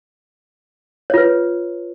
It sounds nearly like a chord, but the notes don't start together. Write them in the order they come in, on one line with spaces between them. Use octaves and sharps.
C#5 F4 B4